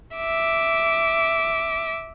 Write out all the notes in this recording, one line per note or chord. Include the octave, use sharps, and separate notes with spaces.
E5 D6